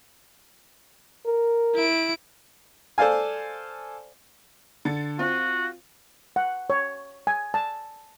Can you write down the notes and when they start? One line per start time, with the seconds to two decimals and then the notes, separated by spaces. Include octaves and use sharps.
1.26 A#4
1.75 E4 D7
2.98 A4 C5 D5 F5 G#5
4.85 D3 A6 C#7
5.19 C4 F4 F#4
6.36 F#5
6.70 C#5
7.27 G#5
7.54 A5